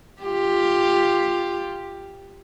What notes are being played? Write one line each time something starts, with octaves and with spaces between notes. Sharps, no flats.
F4 G4